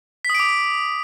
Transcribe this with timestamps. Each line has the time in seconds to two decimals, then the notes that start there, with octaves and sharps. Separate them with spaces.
0.25 B6
0.30 D#6
0.35 D7
0.40 D6